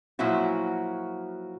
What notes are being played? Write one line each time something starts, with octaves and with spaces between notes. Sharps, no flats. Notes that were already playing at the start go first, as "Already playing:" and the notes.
A#2 F3 F#3 E4 F#4